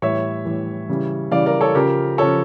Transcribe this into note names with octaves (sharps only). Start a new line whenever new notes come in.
A2 E3 G3 C#5 E5
A2 E3 G3
C#3 E3 G3
C#3 E3 G3 D5 F5
A#4 D5
A4 C#5
C#3 F3 G4 A#4
C#3 F3 A4 C#5